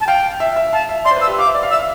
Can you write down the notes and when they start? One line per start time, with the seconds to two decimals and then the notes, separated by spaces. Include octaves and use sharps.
0.01 A5
0.07 F5 G5
0.40 E5
0.56 E5
0.73 F5 A5
0.89 E5
1.05 D5 C6
1.11 C5
1.16 B4
1.21 E6
1.28 G4
1.38 F5 D6
1.46 E5
1.54 D5
1.63 F5
1.71 E5 E6
1.79 F5